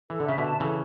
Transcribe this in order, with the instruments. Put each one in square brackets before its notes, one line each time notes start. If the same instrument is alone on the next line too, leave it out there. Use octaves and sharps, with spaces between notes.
[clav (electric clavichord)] E3 [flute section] A4
[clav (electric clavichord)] D3
[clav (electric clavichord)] C#3 [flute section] E5
[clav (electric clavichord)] B2 D3
[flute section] A5
[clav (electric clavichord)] C#3 E3 [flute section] A4